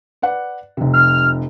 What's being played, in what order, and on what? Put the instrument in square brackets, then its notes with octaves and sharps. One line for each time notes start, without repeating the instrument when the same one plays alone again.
[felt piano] B4 D5 F#5
F1 C3
[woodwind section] F6